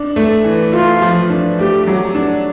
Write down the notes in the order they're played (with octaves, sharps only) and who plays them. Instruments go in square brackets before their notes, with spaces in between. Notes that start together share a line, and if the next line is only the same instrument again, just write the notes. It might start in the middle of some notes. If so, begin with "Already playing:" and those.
Already playing: [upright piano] D4
A3
E3
[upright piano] A3 [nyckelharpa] F4
[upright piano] F3
D4
[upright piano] A3 [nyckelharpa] G4
[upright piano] F#3
D4